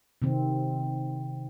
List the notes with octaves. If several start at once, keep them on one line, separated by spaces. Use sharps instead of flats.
C3 D#3 C4